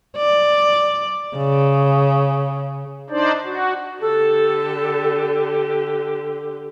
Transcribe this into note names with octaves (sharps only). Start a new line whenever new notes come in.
D5
C#3
D4 D#4 C5 D5
F#4
D3 G4 A4